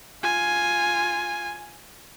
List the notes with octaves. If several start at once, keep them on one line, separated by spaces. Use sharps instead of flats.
F4 G#5